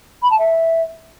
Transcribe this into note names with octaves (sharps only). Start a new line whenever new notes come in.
B5
A5
E5